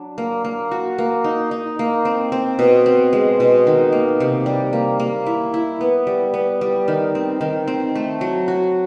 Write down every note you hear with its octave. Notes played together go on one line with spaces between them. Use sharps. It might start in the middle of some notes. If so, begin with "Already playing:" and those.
Already playing: F#3 D4
A#3
A#3
F#4
A#3
D#4
D#4
A#3
C4
C4
B2
C4
G#3
B2
D#3
A#3
C3
G3
A#3
A#3
E4
E4
B3
G3
B3
G3
D#3
C4
D#3
C4
A3
F#3
F#4